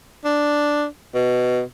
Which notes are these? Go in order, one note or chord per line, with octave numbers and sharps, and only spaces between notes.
D4
B2